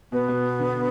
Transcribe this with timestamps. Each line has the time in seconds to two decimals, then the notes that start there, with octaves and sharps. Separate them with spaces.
0.12 B2 B3
0.28 B2
0.59 D3